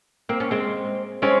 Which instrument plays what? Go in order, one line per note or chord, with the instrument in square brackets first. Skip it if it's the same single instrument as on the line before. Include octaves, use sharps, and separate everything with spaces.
[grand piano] A#3 [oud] C4
[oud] C#4
G#3 C4
[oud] G#3 C4 [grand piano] C#4